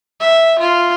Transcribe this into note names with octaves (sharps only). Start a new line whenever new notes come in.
E5
F4